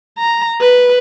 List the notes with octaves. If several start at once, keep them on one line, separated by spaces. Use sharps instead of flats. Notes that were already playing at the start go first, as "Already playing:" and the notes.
A#5
B4